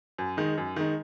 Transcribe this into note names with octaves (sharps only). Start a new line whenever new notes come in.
F#2
D#3 G#3 D#4
F#2
D#3 G#3 D#4